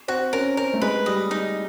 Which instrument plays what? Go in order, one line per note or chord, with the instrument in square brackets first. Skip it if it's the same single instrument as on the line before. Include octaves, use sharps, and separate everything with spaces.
[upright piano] C4 [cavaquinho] F#4
[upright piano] C#4 [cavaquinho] A#4
[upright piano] C4 [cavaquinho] A#4
[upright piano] A3
[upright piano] G#3 [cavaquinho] B4
[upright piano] G3 [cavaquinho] D#5
[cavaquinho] D#4